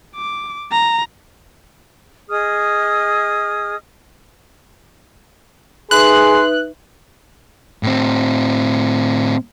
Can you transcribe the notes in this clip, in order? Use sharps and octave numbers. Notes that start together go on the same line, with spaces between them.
D6
A#5
G#4 D#5 D#6 F6
D#4 G#4 B4 E5 C6 F#6
A2 C4